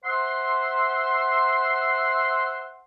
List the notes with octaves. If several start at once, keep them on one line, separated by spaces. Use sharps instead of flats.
C5 E5 F#5 C6